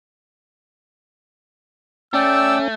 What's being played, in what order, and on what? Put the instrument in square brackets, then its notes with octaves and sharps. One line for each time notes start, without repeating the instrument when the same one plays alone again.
[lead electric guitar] A3 [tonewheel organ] C#4 [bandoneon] D5 G5 [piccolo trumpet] E6